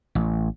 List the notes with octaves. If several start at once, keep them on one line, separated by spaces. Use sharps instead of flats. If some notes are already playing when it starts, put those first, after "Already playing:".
A1